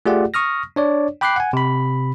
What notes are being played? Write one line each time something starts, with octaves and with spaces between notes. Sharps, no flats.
A3 F4 G4 G#4 D5 F#5
C#6 D#6 F6 A#6
D4 C#5 D5
G5 B5 D6 F#6 G6 C7
F#5 G#5
C3 B5